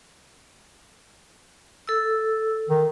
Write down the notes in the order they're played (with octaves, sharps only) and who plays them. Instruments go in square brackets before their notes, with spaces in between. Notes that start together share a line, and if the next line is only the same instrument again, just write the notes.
[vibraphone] A4 E6
[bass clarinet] D#3